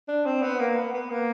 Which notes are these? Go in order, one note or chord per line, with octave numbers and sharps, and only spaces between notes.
D4
C4
B3
A#3
B3
B3
A#3